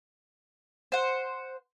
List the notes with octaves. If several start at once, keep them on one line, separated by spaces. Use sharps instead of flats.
C5 F#5